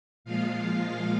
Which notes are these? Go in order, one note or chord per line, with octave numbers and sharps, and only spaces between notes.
A#2 F3 G#3 F4 F5